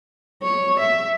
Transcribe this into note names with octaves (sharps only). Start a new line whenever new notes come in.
C#5
E5